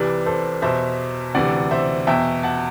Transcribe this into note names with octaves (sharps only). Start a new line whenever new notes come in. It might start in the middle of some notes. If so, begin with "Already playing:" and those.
Already playing: C2 C3 E3 B4 D5
A4 C5
E2 B2 C5 E5
D2 C3 E3 D5 F#5
C5 E5
E2 B2 E5 G5
F#5 A5